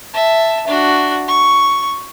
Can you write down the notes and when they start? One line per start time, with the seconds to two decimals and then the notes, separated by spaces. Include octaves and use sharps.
0.14 E5 A5
0.67 D4 F#4
1.28 C#6